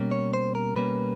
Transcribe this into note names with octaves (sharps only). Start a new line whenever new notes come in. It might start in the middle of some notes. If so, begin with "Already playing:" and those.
Already playing: B2 G3 A#3 C#4
C#5
C5
A#4
B2 G3 A#3 C#4 B4